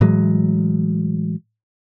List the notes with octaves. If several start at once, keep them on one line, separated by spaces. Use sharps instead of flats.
A2 E3 F#3 G#3